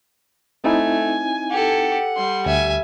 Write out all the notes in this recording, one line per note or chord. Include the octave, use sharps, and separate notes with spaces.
A3 C4 D#4 E4 G#5
G4 A4 F#5
G3 C6
D2 E5 G#5